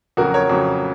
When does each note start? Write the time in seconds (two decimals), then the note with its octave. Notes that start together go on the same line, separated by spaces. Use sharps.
0.17 F2 C#3 F#3 F#4 A#4
0.34 A#4 C#5
0.50 F2 C#3 F#3